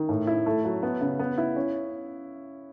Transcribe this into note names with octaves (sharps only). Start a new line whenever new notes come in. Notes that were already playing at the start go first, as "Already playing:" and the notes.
Already playing: D#3
A2
E4
A3
F#3
B3
C#3
B3
E4
C#4